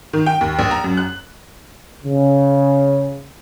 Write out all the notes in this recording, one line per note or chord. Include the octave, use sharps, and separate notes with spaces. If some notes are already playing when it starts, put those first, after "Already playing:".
D#3
G5
D#2
A#1
A#5
F#2
F#6
C#3